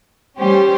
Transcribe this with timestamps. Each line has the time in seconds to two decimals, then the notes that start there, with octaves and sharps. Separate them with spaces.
0.38 G3 C#4 G4 C5